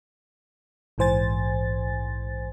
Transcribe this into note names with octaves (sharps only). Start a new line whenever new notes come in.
A#1 G#2 E3 C5 G#5 A6